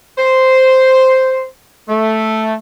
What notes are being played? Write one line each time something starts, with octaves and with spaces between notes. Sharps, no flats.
C5
A3